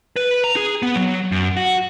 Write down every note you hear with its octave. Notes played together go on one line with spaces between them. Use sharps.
B4
A#5
G#4
B3
F#3
F#2
F#4